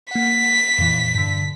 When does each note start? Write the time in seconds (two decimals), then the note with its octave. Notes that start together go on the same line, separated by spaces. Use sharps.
0.11 A#3 F#5 B6
0.79 F2 A#2 E3
1.15 G2 D3